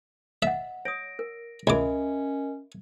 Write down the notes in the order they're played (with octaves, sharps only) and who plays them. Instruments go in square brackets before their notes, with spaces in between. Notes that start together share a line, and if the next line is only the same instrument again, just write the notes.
[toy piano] D#5 F#5 [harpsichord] E5
[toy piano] C#5 D#6 [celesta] A#6 D7
[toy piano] A#4
[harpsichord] C#2 D6 [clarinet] C#4 [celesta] A#4 D#5 [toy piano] E5 B5